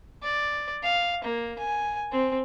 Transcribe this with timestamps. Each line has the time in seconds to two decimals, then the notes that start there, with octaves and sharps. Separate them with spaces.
0.23 D5
0.83 F5
1.24 A#3
1.59 G#5
2.12 C4